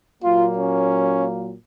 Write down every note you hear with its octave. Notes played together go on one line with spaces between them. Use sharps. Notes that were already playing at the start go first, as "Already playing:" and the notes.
A#2 F#3 A#3 F4
C#4